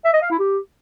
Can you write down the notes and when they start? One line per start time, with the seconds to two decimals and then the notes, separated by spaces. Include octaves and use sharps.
0.04 E5
0.13 D#5
0.22 F5
0.31 E4
0.39 G4